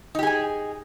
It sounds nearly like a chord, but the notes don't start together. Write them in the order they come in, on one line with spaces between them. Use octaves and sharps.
D#4 G4 G#4 G#5